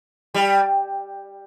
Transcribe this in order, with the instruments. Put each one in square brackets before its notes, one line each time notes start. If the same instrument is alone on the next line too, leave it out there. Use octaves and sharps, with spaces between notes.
[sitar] G3